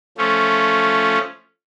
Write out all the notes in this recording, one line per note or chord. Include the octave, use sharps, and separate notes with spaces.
F3 A3 C#4